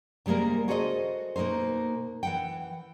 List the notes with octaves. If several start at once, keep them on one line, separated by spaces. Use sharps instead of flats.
C3 G3 G#3 A#3 A#4
F#4 G#4 A4 C5 C#5 D#5
B2 A#3 D#4 A#4 C5
E3 F#5 G5